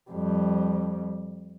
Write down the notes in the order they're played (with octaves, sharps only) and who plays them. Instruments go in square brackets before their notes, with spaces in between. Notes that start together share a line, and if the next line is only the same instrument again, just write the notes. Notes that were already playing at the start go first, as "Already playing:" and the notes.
[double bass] F2 G3